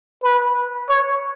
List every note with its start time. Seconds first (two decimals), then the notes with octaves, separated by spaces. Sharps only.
0.23 B4
0.89 C#5